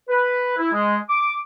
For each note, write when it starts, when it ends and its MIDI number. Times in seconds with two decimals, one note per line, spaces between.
0.09 0.55 71
0.58 0.69 64
0.72 0.97 56
1.10 1.36 86